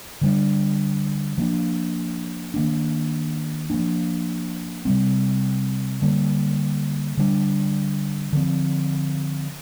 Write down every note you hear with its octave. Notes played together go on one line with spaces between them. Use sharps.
D3 G3 D4
F3 A#3 D4
D#3 A#3 D4
F3 A#3 D4
C3 G3 C4
D3 G3 A#3
D3 G3 A#3 D4
D3 F3 C4